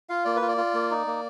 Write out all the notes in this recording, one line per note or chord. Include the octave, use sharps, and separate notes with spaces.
F4 F5
A#3 D5
B4
F4
D5
F4
A#3
D#4
A#3